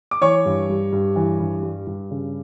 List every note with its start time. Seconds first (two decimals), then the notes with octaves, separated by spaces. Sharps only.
0.11 D6
0.22 E3 C#5 C#6
0.46 G2
0.69 G3
0.92 G2
1.16 E3
1.40 G2
1.63 G3
1.87 G2
2.11 C#3